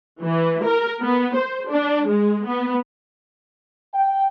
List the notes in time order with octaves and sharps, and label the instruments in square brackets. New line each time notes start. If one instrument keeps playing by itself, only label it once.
[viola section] E3
A#4
B3
C5
D4
G#3
B3
[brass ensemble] G5